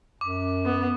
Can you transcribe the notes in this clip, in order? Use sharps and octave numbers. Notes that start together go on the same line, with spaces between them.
F#2 D6
B3